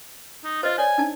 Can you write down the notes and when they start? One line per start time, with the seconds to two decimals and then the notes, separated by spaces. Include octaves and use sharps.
0.44 D#4
0.63 F4 C5 D#5
0.78 C#5 D5 G#5
0.98 D4 D#4 A5